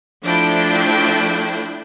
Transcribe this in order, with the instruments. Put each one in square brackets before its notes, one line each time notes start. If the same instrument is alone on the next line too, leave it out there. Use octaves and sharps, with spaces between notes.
[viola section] F3 A3 D4 E4 G5